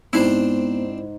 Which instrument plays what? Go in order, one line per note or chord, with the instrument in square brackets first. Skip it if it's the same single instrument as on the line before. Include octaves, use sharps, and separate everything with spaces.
[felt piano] G#2 [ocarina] B3 [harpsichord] C4 D4 C5 [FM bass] E4